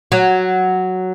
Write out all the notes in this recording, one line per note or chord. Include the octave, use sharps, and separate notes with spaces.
F#3